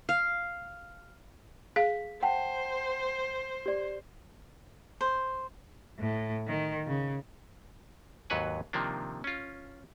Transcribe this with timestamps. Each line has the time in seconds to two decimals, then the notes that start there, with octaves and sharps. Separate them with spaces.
0.09 F5
1.76 G#4 F5 B6
2.23 C5 F#5 G5 A5
3.66 G4 D5
5.01 C5
5.99 A2
6.47 D#3
6.87 C#3
8.30 D#2 G#2 F#3 B4 F#5 G#5
8.73 C3 D#3 F3 A#3 D4
9.24 C#4 F4